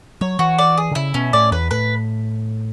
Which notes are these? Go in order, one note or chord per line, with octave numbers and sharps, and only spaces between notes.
F#3 C#5
E3 F#4
D5
G#4
D3
C#3 E4
B2 C#4
A2 D5
E2 B4
A2 B4